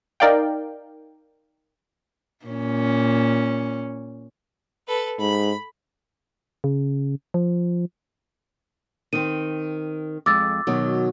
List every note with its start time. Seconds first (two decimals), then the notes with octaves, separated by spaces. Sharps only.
0.20 D#4 A#4 D5 F5 G5
2.46 A#2 C#4
4.88 A4 B4
5.19 G#2 B5
6.64 C#3
7.34 F3
9.13 D#3 C4 D#7
10.26 F2 G#3 D6 E6 A6
10.67 B2 D#3 F#3